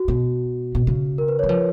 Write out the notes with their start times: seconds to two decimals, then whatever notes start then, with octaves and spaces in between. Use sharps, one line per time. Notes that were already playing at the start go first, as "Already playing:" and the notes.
Already playing: F#4
0.08 B2
0.75 B2
0.87 C#3
1.18 A#4
1.28 B4
1.39 C#5
1.44 F#3
1.49 F3 B4